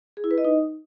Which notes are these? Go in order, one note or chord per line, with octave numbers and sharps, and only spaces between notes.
G#4
E4
B4
D#5
D#4